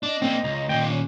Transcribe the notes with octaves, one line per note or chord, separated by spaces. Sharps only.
D4 D#5
A#3 C4 D4
C#2 A#5
D#2 A#2 G5
C#4 D4